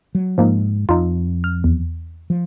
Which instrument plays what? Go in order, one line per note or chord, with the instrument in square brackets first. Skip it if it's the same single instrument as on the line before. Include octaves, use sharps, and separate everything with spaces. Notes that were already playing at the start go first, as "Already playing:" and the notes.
[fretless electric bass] F#3
[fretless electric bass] G#2 [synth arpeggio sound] F3 A#3 D#4
[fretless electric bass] F2 [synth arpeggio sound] D#4 F4
[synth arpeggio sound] F6
E2
[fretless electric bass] F3